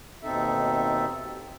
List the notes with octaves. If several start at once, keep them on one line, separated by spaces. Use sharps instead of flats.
D#2 B2 C4 D#4 A4 E5